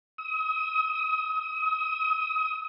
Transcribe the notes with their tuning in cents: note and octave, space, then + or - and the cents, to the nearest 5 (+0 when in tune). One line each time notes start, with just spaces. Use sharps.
D#6 +35